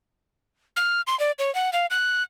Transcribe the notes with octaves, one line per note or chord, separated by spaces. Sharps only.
F6
C6
D5
C#5
F#5
F5
F#6